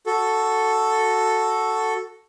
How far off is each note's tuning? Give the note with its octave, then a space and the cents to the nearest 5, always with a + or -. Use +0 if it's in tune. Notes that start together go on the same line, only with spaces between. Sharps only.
F#4 +0 A4 +0